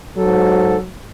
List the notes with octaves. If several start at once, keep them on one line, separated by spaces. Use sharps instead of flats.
G#2 F#3 A4